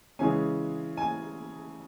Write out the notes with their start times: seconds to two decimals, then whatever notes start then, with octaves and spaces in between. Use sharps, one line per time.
0.19 C#3 E3 G#3 C#4 G#5
0.97 G#5